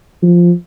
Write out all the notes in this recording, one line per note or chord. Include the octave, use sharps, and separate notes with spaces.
F3